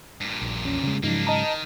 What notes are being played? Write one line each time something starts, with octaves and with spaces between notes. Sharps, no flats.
G2 A#2
A#1
E2 C#4
C#3 G#3
G#2 C#3 F3 F#3 A#3 D4 D#4
D#3 D#5 A5 A#5